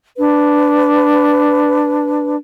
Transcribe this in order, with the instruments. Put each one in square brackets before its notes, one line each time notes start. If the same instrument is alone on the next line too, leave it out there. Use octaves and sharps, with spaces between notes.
[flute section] D4 B4